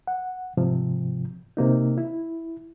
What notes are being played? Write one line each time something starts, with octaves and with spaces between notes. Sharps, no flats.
F#5
G#2 C3 F3
C3 A#3 D#4
E4